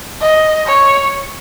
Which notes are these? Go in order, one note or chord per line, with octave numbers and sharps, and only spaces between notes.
D#5
C#5